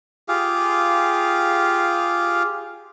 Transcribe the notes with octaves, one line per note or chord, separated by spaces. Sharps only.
F4 G4 G#4 F5